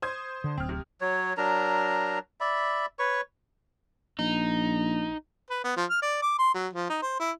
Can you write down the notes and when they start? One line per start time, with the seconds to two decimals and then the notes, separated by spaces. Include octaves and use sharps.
0.02 C5 D#6 G#6
0.44 D3
0.57 D1 C4 F6
0.69 C3
1.01 F#3 C#5
1.37 F#3 D4 A#4 A#5
2.40 D5 E5 B5
2.99 B4 C#5 C#6
4.19 A#1 D#4
5.50 B4
5.64 B3
5.77 F3
5.90 F6
6.02 D5
6.22 D6
6.39 C6
6.54 F#3
6.73 F3
6.90 D#4
7.02 C5
7.20 E4